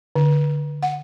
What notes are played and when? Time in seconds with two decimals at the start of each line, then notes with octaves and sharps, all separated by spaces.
0.15 D3
0.83 F#5